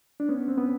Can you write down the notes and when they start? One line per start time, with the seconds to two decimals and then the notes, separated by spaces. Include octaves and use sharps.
0.20 D4
0.29 B3 C#4
0.48 C4
0.57 B3